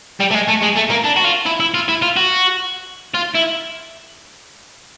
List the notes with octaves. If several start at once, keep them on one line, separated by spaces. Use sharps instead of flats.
G3
A3
G#3
A3
G#3
A3
A#3
D4
F#4
F4
E4
E4
F4
E4
F4
F#4
F4
E4